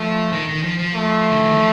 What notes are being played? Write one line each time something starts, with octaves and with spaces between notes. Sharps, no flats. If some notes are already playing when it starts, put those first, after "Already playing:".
Already playing: F3 A3
D#3
D#3
F3
F3
A3
D3
D#3
F3